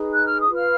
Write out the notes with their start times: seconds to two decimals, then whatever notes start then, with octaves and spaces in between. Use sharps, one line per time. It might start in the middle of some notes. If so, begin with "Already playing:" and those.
Already playing: D#4 G#4 B4
0.13 F#6
0.27 F6
0.41 D#6
0.48 F4 B4
0.55 F5 F6